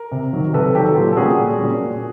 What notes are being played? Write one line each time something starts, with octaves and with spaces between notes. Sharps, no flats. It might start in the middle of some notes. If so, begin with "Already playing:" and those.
Already playing: A#4
C3
D#3 F#3
C3 A4 B4
D#3 F#3 G4 A4
A#2 F4 G4
A4
G3 A#3 C#4 F#4 G#4
A#2
G3 A#3 C#4
A#2